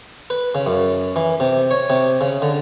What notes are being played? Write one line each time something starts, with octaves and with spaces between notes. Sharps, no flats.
B4
C#3
F#2
E3
C3
C#5
C3
C#3
D3